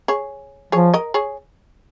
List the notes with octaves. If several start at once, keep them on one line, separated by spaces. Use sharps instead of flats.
G#4 C#5
F3 G#4 C#5
A#4 D#5
G#4 C#5